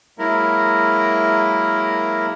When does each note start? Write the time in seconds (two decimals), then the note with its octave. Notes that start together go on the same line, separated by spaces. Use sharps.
0.19 F#3 G#3 A#3 E4 A#4